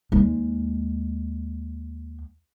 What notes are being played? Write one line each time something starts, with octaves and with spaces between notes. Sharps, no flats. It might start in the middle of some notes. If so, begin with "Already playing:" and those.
D#2 G#3